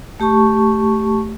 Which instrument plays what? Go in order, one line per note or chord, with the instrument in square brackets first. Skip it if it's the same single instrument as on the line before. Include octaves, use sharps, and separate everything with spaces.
[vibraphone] A3 G4 A5 C#6